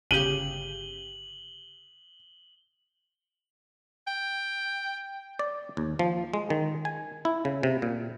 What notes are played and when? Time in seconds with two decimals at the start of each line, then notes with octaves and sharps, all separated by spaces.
0.11 G1 C#3 G4 D#7 F#7 G7
4.07 G5
5.39 D5
5.77 D#2
5.99 F3
6.34 G#3
6.50 D#3
6.85 G#5
7.25 E4
7.45 C#3
7.63 C3
7.82 A#2